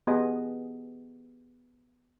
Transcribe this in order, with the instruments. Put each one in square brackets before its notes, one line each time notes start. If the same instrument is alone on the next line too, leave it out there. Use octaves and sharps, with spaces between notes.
[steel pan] B3 G4 G#4 D#5